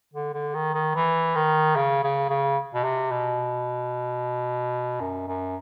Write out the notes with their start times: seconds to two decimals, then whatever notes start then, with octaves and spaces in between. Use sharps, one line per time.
0.14 D3
0.34 D3
0.55 D#3
0.74 D#3
0.95 E3
1.35 D#3
1.76 C#3
2.04 C#3
2.30 C#3
2.74 B2
2.84 C3
3.12 B2
5.01 F#2
5.28 F#2